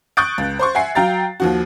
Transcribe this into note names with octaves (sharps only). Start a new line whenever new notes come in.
C#6 D#6 F#6 G6 A6 D7
C#2
C5 C6 C#6
E5 F#5 G#5 C7
F#3 F5 G5 A#5 A6
D#2 F3 F#4